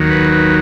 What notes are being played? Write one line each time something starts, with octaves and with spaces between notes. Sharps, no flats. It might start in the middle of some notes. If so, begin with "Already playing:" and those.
Already playing: D#2 D#3 F#3
B4
B4